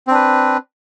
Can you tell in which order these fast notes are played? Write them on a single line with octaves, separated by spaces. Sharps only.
C4 D4 B4